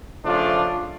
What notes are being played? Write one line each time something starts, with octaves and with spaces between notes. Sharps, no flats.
C#3 F3 A3 D4 F4